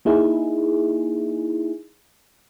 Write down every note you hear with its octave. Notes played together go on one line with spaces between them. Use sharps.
A#3 D#4 E4 G#4